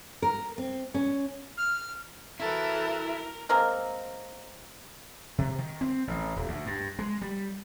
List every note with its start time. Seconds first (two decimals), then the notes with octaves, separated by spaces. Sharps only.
0.22 A#4
0.58 C4
0.94 C#4
1.58 F6
2.40 E3 E4 F#4 A4 A#4
3.49 G#3 A#3 C4 A#4
5.38 C3
5.59 D#3
5.81 C4
6.07 A1
6.36 D#1
6.48 D2
6.66 G2
6.99 G#3
7.22 G3